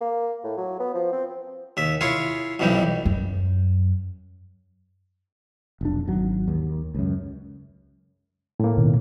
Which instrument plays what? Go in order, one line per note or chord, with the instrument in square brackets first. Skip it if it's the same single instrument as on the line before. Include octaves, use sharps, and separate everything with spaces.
[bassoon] A#3
A2
F#3
B3
F3
C4
[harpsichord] D#2 E5
E4 F4 G#4 C#5
B1 F2 E3 G3 D#4
[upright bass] F#2
[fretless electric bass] F1 B1 D4
G#1 F#3
D#2
C#2 F#2
[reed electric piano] A2 A#3
[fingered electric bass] B2 D#3